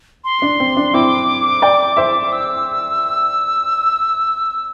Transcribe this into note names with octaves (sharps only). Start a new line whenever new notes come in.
C6
D4
C4
D4
C4 E4 D6
D5 G5
C5 E5
E6